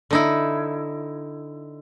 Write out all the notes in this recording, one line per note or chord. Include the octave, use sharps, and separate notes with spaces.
D3 D#4 E4